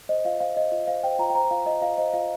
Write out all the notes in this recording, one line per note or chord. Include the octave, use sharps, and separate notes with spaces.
C5 D#5
F4 F5
C5 F5
C5 D#5
F4 D#5
C5 F5
C5 G5
F4 A#5
G5
C5 A#5
F4 F5
F4 D#5
F4 F5
C5 D#5
F4 F5